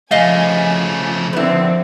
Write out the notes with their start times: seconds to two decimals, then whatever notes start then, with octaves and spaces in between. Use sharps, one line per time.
0.11 C#3 F3 A3 D#5 F5 G#5
1.33 D3 D#3 C4 E4 B4